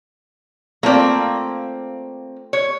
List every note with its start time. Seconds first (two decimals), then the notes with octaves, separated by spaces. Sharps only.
0.83 A3 A#3 C4 F4 D5
2.53 C#5